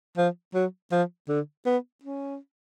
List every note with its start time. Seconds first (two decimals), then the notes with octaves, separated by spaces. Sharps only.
0.17 F3
0.54 F#3
0.91 F3
1.29 D3
1.66 B3
2.04 C#4